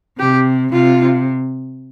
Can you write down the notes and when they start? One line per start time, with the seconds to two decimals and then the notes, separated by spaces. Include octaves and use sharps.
0.19 C3 G4
0.72 C3 F4